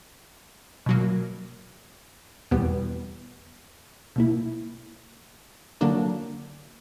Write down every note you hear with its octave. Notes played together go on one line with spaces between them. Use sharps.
B2 F#3 A#3
E2 B2 G3 B3
B2 A#3 E4
D3 F#3 A#3 D4